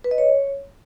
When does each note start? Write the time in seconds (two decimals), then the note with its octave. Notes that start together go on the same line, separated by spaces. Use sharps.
0.04 B4
0.11 D#5
0.18 C#5